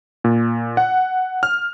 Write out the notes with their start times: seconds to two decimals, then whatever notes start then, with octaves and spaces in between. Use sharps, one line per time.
0.24 A#2
0.77 F#5
1.43 F6